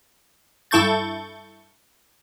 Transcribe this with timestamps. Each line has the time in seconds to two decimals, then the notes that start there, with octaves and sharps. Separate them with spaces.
0.71 G2 E4 A4 C#6 G6 A6